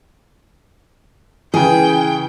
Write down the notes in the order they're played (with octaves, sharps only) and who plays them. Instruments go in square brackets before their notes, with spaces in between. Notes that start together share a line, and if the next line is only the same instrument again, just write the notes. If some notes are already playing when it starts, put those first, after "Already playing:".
[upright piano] C#3 E3 [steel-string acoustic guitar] G#4 [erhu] G5